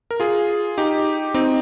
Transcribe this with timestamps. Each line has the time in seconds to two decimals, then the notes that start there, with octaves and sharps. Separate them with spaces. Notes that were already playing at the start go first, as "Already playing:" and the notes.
0.11 A#4
0.20 F4 G#4
0.78 D#4 G4
1.34 C4 D#4